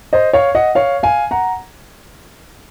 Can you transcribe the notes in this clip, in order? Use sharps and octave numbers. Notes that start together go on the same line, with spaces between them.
C5 D#5
C#5 F5
D#5 F#5
C#5 F5
F5 G#5
F#5 A#5